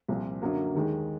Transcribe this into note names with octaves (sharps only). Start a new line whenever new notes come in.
C2 A#2 F3
F#2 D3 F#3 A#3
D#2 D#3 G#3